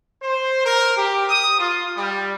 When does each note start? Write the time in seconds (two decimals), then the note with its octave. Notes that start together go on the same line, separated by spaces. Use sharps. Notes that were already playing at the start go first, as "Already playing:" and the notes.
0.22 C5
0.65 A#4
0.97 G4
1.28 D#6
1.59 F4
1.97 G3